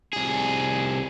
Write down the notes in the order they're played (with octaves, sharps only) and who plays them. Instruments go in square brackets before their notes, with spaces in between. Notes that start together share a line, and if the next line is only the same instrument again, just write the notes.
[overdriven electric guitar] C2 G#4